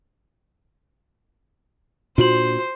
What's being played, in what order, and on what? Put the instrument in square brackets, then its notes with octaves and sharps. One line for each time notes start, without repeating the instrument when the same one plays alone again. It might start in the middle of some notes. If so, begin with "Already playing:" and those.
[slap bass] A#2 D4 [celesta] F4 F#4 F#7 [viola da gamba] C5